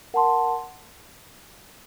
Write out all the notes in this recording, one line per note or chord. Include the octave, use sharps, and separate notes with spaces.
A#4 F#5 A5 C6